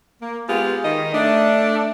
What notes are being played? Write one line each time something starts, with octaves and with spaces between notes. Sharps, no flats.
A#3
G#3 B3 F4 G4
D#3 D#5
A3 D4